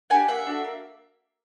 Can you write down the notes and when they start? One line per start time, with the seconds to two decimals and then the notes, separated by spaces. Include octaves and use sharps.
0.10 D4 G4 F#5 G#5
0.28 A#3 E5 F#5
0.47 D4 F#4 A4
0.64 A#3